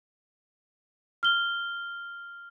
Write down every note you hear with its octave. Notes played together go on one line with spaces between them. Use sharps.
F6 G7